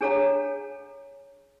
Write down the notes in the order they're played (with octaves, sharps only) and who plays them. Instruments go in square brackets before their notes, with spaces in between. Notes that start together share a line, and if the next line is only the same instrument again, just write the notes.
[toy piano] D4 G#4 A4 C#5 F#5 A#5